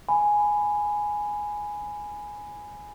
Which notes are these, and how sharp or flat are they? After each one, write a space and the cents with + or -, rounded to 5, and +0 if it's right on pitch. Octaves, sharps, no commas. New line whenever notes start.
G#5 +0 B5 +5